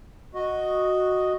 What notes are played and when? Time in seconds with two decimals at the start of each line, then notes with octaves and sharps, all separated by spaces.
0.35 F#4 D#5